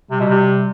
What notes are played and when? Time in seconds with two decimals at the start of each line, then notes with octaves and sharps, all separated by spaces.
0.11 C3 G3
0.20 B2
0.30 C3